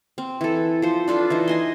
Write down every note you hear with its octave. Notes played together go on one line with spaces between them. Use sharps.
C4
E3 A4
F3 C5
D4 F4 A4 B4
E3 D#4 C5
D#5 G#5 C6